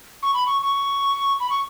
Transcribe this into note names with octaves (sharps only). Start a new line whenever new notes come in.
C#6
B5
C#6
C#6
B5
C#6